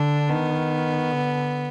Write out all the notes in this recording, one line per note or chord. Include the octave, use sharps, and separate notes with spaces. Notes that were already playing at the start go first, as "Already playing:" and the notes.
Already playing: D3 D4
D#3 B3
D3